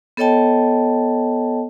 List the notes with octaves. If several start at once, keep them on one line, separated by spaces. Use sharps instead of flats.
B3 A4 C#5 D#5 G5 A5